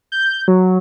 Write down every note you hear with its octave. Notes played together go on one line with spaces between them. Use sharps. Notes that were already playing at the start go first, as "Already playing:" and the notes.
G6
F#3